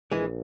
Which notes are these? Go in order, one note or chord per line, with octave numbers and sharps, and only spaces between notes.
A#1 E3 G#3